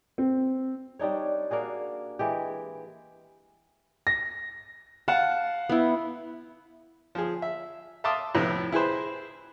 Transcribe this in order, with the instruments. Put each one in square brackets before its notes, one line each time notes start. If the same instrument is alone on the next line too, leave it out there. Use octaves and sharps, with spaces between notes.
[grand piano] C4
[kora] G3 D4 D#4 C#5
A#3 D4 F#4 G#4
E3 G#3 G4
[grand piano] A#6
[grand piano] F5 F#5 [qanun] A5
[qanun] B3 E4
[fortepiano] F3 G#4
E5
E5 F5 A5 C6 D6 D#6
F2 A2 C3 B3
E4 G#4 B4 C5